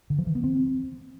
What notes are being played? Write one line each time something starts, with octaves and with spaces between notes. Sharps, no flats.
D3
F3
E3
B3
C4